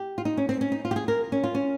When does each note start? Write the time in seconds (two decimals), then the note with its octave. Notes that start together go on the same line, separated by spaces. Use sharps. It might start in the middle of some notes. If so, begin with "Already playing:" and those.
Already playing: G4
0.18 F4
0.25 D#4
0.37 C#4
0.49 C4
0.61 C#4
0.72 D#4
0.85 F4
0.91 G4
0.96 G#4
1.08 A#4
1.32 C#4
1.44 F4
1.55 C#4